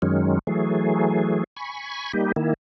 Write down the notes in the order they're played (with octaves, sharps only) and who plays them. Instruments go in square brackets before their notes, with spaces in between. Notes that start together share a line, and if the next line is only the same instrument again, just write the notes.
[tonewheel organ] F#2 D#3 F#3 G#3 C#4
E3 F#3 A3 G#4
G#5 B5 C#6
G3 A#3 D#4 G4
D#3 A#3 E4